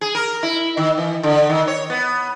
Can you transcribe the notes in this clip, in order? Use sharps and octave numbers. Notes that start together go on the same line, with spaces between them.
G#4
A#4
E4
D#3
E3
D3
D#3
C#5
B3